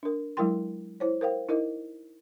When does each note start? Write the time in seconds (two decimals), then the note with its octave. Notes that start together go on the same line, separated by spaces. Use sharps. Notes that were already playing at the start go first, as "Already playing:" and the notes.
0.03 D4 A#4
0.37 F#3 G#3 E4 A#4 G5 C6
1.00 E4 C5 C#5
1.21 A#4 C5 F5 G5
1.49 D#4 E4 A#4 D#5